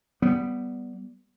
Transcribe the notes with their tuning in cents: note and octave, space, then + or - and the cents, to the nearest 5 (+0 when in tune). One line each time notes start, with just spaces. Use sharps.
G3 -10 B3 +0